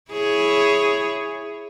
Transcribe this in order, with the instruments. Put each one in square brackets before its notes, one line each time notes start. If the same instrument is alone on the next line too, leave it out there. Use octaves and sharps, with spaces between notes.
[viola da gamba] E4 G#4 C#5